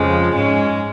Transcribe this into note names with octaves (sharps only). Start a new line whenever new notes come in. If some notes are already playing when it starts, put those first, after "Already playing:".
Already playing: F2 C#3 F3 G#3
G#2 G#3 C#4